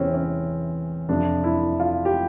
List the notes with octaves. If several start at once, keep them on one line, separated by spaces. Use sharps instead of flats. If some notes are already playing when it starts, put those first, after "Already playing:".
Already playing: E2 C3 E3 C4 C#4
C#4
F2 C3 F3 D4
E4
F4
G4